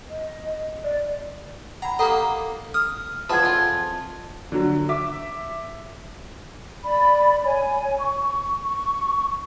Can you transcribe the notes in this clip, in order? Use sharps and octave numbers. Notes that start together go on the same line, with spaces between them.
D#5
D5
F#5 A#5 B5
A#3 G4 A4 D#5 F#5 A#5
D#6 F6
E2 F3 F4 E5 F#5 A5 G#6
F2 F4 G#5
D3 F#3
E5 D6
D5 B5
C#5 G#5
C#6
C#6